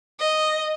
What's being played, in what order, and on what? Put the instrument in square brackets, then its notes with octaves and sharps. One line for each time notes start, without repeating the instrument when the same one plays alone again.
[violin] D#5